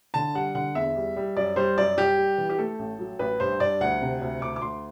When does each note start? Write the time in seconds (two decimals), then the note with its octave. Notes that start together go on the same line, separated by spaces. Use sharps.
0.14 D3 A5
0.34 G3 F#5
0.55 D3 F#5
0.75 E2 E5
0.96 G3
1.16 G3
1.36 F#2 D5
1.56 G3 C5
1.78 F#2 D5
1.98 G3 G4
2.17 G3
2.38 E3
2.49 G4
2.58 A3 A4
2.79 A1
2.99 F#3
3.19 A1 B4
3.40 G2 C5
3.60 G2 D5
3.81 D2 F#5
4.01 C3
4.22 D2
4.41 D2 D6
4.56 D6
4.62 D2 C6